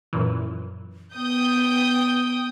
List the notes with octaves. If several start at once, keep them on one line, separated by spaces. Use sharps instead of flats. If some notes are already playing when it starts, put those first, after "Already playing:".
F#2 A#2 E3
B3 G5 D#6 G6